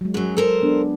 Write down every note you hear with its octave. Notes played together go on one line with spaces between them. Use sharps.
F#3 G#3
F#2 F#3 G#4
A4 A#4 C5
B3 D4